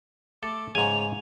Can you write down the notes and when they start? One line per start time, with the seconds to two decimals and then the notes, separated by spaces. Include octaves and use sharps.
0.43 A3 A4 D6
0.75 G#2 C#3 C#5 G#5 F7